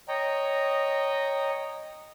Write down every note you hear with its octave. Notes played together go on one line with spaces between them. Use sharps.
C#5 D#5 G5 A#5